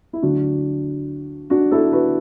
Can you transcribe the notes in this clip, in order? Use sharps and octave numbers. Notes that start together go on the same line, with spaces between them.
E4
D2 D3 F#3 D4 F#4
D4 F#4
E4 A4
F#4 B4